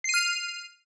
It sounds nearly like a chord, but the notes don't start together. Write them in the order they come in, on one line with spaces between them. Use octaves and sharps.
C7 D#7 F6